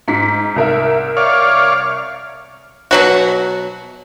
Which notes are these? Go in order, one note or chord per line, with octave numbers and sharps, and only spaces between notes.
G#2 B6
C2 A#4 E5
C#5 D5 F5
B2 F#3 F#4